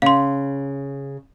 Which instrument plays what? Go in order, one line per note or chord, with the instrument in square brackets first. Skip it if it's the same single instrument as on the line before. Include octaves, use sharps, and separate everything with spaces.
[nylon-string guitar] C#3 [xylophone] F5 C6